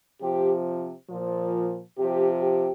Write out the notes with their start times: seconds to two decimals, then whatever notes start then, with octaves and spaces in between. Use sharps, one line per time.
0.20 C3 F3 G4
1.08 A#2 F3
1.97 C3 F3 G4
2.42 G4